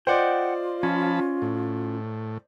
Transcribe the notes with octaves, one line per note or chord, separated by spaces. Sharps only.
F4 C5 D5 D#5 F#5 G5
F3 C#4 A5 B5
A2